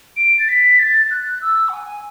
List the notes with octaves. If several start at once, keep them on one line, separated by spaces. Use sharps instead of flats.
D7
A6
B6
A6
F#6
E6
F#5
G#5